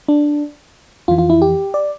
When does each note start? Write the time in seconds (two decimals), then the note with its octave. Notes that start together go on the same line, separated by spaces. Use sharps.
0.08 D4
1.08 F2 E3 F4
1.18 F4
1.30 E4
1.42 G4
1.74 D5